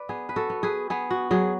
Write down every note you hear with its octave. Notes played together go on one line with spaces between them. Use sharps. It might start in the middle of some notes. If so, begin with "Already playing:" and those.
Already playing: B4 D5
B3 G#4
B4
F#4 A4
B3
G#4 B4
B3 G#4
F#4
F#3 G#4